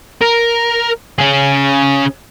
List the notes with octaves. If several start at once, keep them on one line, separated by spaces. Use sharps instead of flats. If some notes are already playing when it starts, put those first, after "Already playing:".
A#4
C#4 G#4